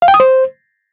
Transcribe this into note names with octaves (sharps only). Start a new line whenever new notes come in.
F5
G5
D#6
C5